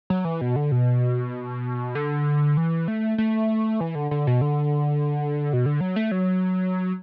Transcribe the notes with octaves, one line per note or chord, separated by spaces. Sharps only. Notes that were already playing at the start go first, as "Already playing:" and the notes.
F#3
E3
B2
D3
B2
D3
E3
A3
A3
E3
D3
D3
B2
D3
B2
D3
F#3
A3
F#3